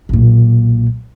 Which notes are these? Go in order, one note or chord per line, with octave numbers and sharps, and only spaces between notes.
B1 A#2